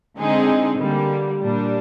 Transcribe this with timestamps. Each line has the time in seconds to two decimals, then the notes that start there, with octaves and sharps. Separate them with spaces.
0.18 D3 G#3 C4 D#4 G#4
0.79 D3 G3 A#3
1.41 A#2 G3 D4